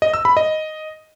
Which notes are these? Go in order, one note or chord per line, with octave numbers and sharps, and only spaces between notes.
D#5
E6
B5
D#5